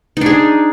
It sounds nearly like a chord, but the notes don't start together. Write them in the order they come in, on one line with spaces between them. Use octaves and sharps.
D#4 D4 G#4